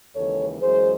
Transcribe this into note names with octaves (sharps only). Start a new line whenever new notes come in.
D#2 C#3 E3 G#3 A4 C#5
F#2 E3 G#3 G#4 C5